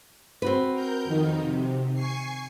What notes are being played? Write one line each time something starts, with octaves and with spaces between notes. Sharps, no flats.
C4 F#4 B4
A#4 G6
F2 D#3 D#4
C3
G#5 C#6 C7